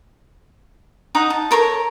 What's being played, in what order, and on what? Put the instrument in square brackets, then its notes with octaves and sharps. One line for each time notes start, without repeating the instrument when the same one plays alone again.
[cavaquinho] D#4 F#5 A#5 D#6
A5
A4 A#4 C#5 C#6